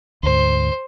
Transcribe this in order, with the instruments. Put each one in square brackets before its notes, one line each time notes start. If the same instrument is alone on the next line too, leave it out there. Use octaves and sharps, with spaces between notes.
[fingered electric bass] D2 G#2 [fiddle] C5